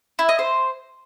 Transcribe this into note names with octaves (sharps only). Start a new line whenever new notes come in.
E4
D#5
C5